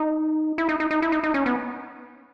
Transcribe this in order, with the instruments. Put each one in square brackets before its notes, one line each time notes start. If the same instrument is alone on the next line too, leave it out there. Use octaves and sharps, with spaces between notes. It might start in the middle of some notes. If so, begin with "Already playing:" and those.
Already playing: [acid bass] D#4
E4
D#4
D#4
D#4
E4
D#4
D#4
C#4
B3